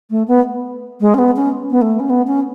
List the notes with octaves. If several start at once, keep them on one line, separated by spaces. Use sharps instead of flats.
A3
B3
G#3
C#4
B3
C#4
B3
A3
C#4
B3
C#4